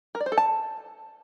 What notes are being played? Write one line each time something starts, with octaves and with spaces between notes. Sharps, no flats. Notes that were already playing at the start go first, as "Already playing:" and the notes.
A#4
D5
C5
A4
A5